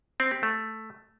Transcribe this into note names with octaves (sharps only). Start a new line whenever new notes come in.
C4
G4
A3